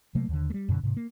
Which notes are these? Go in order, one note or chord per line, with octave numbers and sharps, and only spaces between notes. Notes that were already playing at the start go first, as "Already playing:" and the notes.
C3 F#3 A3 A#3
D#2 D3
G3 A3
F#2 B2 D3
G#2 C3
A#3